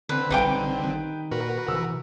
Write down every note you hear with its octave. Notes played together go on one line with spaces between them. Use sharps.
D3 C4 B4
A#1 G3 D#4 G4 B4 G5 D6
D#3
A#2 F#4 A#4 B4
C3 D#3 E3 E6